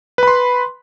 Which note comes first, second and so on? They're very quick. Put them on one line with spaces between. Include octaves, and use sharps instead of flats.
B4 B5 C6